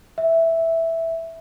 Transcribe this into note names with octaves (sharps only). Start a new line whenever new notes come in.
E5